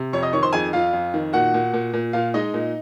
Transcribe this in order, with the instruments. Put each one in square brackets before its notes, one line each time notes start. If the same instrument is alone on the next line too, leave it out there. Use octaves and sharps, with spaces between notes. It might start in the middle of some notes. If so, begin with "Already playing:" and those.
Already playing: [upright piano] C3
F2 C#5 C#6
D#5 D#6
D#3 C#5 C#6
C5 C6
F2 G#4 G#5
F2 F4 F5
F2
D#3
A#2 F#4 F#5
A#2
A#2
A#2
A#2 F4 F5
G#3 D#4 D#5
A#2